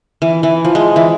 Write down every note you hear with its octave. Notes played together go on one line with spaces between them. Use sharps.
E3
E3
F3
G#3
E3